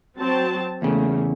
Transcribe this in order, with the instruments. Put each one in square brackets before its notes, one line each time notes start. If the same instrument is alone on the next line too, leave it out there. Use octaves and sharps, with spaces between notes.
[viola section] F#3 C4 A5
[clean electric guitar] E2 C#3 [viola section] A3 A#3